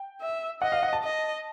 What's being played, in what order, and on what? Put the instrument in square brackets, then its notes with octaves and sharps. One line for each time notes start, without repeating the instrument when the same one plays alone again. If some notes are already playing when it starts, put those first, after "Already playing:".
Already playing: [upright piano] G5
[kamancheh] E5
[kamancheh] D#5 [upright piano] F#5
[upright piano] F5
F#5
A5
[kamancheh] D#5